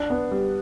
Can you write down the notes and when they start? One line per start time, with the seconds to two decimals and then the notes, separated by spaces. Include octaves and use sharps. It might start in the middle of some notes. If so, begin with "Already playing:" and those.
Already playing: D4
0.10 B3
0.32 G3